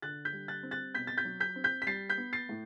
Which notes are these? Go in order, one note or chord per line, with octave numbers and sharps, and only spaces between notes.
D3 F#6 A6
G6 B6
G3
F#6 A6
C4
F#6 A6
B2 G6 B6
A6
G6 B6
F#3
G6 B6
C4
G6 B6
B6
G3 A6 C7
G6 B6
B3
A6 C7
A2